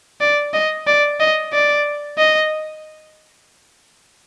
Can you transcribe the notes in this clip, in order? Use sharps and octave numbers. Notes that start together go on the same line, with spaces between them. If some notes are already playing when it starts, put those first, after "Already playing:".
D5
D#5
D5
D#5
D5
D#5